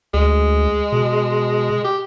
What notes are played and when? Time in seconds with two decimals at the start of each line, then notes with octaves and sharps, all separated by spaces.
0.14 D2 G#3
0.92 B2
1.84 G4